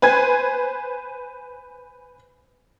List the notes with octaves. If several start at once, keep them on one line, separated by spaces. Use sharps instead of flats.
B4 C5 G#5 G#6